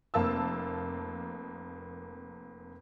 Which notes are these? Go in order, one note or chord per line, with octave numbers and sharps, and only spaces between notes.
F1 F2 A#3 A5 E6